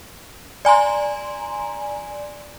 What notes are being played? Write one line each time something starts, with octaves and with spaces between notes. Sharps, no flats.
D5 G#5 A#5 C6